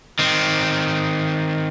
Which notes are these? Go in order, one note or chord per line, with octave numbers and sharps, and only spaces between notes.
D#3 C4